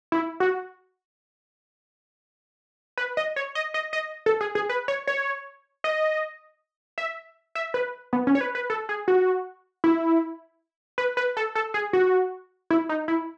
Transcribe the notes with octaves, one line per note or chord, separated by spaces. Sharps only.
E4
F#4
B4
D#5
C#5
D#5
D#5
D#5
A4
G#4
G#4
B4
C#5
C#5
D#5
E5
E5
B4
B3
C#4
C#5
B4
B4
A4
G#4
F#4
E4
B4
B4
A4
A4
G#4
F#4
E4
D#4
E4